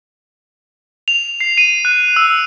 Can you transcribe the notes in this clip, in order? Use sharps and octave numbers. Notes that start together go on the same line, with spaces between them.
F7
C7
D#7
F#6
E6